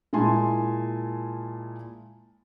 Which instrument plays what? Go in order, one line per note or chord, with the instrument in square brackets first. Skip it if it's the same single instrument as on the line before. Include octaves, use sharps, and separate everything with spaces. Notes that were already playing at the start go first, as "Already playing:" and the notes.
[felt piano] A#2 G#3 E4 G#5 A5 C6